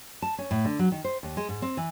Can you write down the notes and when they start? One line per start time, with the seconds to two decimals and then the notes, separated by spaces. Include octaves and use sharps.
0.22 A5
0.38 C#4
0.51 A2
0.65 D3
0.79 F#3
0.92 D#3
1.05 C5
1.23 D#2
1.37 G#3
1.49 G#2
1.62 C4
1.77 E3